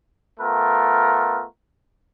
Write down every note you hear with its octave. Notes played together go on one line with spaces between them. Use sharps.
A3 B3 F4 A#4